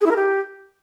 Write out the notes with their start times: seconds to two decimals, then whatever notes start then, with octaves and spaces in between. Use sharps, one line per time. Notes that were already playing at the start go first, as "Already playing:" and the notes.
0.01 G#4
0.06 E4
0.11 A#4
0.16 G4